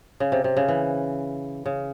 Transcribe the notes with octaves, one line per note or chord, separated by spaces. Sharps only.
C#3
C3
C3
C#3
E3
C#3